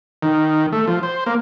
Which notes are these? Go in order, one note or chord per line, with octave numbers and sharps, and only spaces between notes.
D#3
A3
F3
C5
A#3